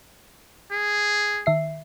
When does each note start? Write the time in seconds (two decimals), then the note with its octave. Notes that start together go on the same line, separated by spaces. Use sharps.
0.71 G#4
1.46 D#3 E5 C7